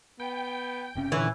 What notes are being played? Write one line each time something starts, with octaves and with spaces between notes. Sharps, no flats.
B3 G5
F#1 C3 C#4
A#2 D3 E3 C#4